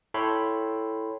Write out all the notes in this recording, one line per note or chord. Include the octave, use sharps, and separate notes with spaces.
E4 A4 C#5 G5 B5 C6